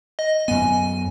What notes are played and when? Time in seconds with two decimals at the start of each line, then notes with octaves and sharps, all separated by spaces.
0.19 D#5
0.48 F#2 B3 G#5